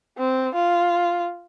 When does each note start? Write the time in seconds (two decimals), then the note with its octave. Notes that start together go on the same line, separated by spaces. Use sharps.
0.17 C4
0.55 F4